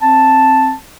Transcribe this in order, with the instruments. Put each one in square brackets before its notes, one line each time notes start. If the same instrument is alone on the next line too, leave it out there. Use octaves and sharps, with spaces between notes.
[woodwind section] C4 A5